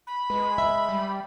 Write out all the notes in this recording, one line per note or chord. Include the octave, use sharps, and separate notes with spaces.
B5
G#3 B4
E5
G3